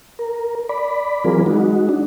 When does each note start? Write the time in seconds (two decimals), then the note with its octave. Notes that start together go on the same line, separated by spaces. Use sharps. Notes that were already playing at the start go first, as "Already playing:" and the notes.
0.19 A#4
0.69 D5 B5
1.25 E3 F#3 C4 F4 G#4 A#4
1.46 G#3 D#4 F#4
1.89 D4